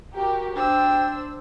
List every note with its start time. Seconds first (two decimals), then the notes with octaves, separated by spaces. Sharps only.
0.14 F#4 G4 A#4
0.55 D4 C5 G5 E6